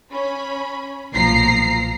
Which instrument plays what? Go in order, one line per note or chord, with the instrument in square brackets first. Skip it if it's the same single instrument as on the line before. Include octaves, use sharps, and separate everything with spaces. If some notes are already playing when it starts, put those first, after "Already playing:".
[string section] C#4 B5
B1 A#2 F3 A#5 C7